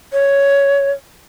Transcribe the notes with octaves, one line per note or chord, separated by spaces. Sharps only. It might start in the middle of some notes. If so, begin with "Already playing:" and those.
C#5